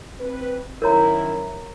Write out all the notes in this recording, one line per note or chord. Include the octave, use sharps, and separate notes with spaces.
C4 B4
F#2 D#3 E4 A#4 C#5 A#5